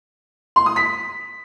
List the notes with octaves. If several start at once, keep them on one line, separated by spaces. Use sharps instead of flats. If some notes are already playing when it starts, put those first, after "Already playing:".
C6
D#6
B6